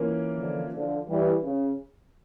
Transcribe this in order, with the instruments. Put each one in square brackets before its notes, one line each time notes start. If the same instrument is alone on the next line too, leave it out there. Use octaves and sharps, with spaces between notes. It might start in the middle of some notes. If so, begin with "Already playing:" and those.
Already playing: [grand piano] E3 A#3 C#4 F4 A#4
[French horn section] D3 F3
D3 F3
E3 G3
C#3